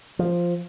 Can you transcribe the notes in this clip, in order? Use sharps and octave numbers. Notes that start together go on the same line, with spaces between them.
F3